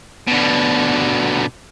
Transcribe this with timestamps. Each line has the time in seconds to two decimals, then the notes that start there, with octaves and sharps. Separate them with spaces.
0.28 B2 D3